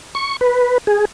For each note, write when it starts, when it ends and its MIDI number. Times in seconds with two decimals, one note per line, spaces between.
0.15 0.37 85
0.41 0.78 71
0.87 1.05 68